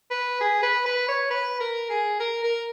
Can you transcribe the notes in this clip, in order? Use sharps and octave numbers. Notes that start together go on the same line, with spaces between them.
B4
G#4
B4
B4
C#5
B4
A#4
G#4
A#4
A#4